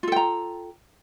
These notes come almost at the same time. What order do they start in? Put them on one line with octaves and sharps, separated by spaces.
F4 A4 G5 A#5